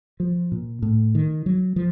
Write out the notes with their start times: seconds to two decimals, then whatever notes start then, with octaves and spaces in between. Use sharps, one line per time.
0.20 F3
0.52 A#2
0.82 A2
1.15 D#3
1.46 F#3
1.76 F3